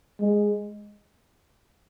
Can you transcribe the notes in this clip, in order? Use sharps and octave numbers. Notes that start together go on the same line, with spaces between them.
G#3